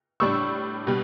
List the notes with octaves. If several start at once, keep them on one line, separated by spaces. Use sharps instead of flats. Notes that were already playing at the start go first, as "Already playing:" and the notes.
A2 G3 D4 C#6 E6
B2 G3